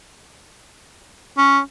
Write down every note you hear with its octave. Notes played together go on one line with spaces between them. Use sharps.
C#4